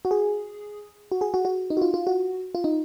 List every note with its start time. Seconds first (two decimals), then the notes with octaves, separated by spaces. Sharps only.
0.05 F#4
0.11 G#4
1.12 F#4
1.21 G#4
1.34 F#4
1.45 F#4
1.70 D#4
1.77 F#4
1.82 F4
1.94 F4
2.07 F#4
2.55 F4
2.64 D#4